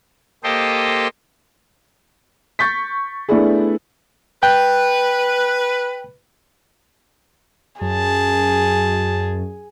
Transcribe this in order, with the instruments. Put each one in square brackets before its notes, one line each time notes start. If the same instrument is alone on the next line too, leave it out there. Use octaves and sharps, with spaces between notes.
[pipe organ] A#3 G4 A4 C5 D#5 G5
[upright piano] C#6 G6 A6 B6
A3 B3 D4 E4 G#4
[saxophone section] B4 [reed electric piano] G5
[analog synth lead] F#2 [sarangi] G#4 [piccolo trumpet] A5